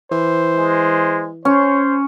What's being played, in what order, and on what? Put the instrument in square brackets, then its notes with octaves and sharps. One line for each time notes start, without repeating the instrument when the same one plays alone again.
[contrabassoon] E3 [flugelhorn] C5
[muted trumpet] G#3
[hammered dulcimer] C#4 [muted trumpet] C5 [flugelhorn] C#5